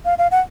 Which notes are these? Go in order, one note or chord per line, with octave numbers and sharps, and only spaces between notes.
F5
F5
F#5